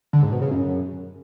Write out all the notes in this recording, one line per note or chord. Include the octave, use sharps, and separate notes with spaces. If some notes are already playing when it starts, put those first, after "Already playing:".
D3
G#2
B2
C#3
F#2